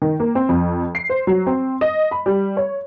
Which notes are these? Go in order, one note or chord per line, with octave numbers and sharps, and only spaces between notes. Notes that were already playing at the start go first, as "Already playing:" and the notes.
D#3
A#3
C4
F2
C7
C5
F#3
C4
D#5
B5
G3
C#5